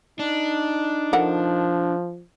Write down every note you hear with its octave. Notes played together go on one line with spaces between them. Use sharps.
D4 D#4
F3 A4 A#4 F#5